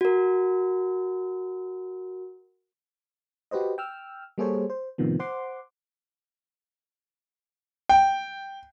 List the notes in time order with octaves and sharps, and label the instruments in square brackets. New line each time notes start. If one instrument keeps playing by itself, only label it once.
[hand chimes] F#4 A#4
[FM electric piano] F#4 G4 B4 C5 D#5
G5 E6 F6
G3 A#3 G#4 A4 C5 C#5
C5
A2 C3 D#3 F3 B3
C5 F#5 C6 D6
[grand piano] G5